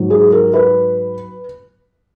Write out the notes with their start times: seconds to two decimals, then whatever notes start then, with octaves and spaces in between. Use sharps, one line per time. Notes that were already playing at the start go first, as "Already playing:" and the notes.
Already playing: G#2 F#3
0.10 G#4
0.32 A#4
0.54 B4